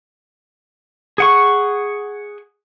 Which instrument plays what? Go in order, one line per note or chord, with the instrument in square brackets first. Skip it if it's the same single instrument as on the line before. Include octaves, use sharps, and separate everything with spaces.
[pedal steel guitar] G#4 F#5 C#6